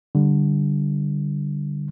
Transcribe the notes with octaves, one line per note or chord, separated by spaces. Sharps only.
D3 G3